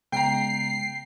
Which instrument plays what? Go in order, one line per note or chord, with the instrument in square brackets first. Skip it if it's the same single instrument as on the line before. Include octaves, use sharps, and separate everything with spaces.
[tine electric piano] C#3 G#3 B3 [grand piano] G5 A#5 [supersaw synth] C7